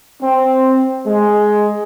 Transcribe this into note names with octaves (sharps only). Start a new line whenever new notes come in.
C4
G#3